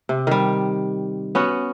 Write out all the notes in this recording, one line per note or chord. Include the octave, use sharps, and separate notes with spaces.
C3
D#3 G3
B3 C#4 F#4